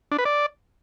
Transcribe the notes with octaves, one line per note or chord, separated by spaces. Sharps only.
D4
B4
D5